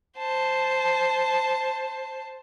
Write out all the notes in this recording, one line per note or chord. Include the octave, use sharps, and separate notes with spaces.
C5 A5